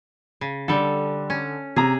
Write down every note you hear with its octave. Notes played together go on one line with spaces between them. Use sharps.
C#3
D3 G3 A4
C#4
C3 G#4 A#5